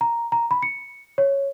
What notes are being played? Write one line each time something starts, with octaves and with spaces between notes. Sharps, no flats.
A#5
A#5
B5
C#7
C#5